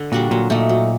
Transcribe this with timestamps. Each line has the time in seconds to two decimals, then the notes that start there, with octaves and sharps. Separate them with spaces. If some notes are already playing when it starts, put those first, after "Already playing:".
Already playing: D3
0.12 A#2 G3 D4 F#4
0.31 A#2 F#3
0.50 A#2 A3 D#4
0.69 F#3